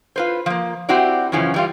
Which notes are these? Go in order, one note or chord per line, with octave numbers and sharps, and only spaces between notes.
F4 B4 C5
F3 A#3
C4 E4 F#4 G4 C5 D5
F#2 C#3 E3 F3 C#4
E3 G3 F4